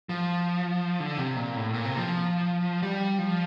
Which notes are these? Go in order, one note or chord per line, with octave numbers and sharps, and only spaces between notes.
F3
D3
C3
A#2
A2
A#2
C3
F3
G3
F3